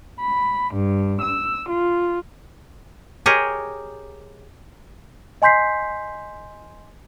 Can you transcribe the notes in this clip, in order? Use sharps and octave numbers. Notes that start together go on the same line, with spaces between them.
B5
G2
E6
F4
G4 G#4 A#4 C#5 D#5
D#5 G#5 C6 G6 B6 C7